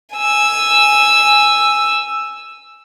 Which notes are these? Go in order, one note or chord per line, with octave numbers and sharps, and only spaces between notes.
G#5 E6